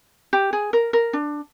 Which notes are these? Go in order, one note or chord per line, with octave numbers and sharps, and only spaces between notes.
G4
G#4
A#4
A#4
D4